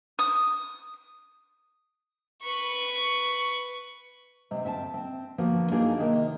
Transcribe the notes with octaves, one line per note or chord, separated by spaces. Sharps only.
D#6
B4 C#6
C3 G#3
D2 C4 E5 G5 A5
C4
D3 F3 A#3 B3 F#4
A#3 D4 D#4 F4 F#4 G#4
C3 D#3 A#3